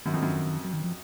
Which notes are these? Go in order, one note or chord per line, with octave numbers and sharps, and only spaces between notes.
F#2 D#3
F2
F#2
F#3
D#3
F3